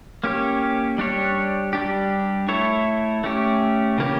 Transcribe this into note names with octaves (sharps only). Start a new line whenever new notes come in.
A#3 C#4 G4 C#5
G3 D4 G4 C#5
G3 D4 G4
A3 E4 A4 C#5
A3 C#4 G4
C#3 E3 A#3 C#4 G4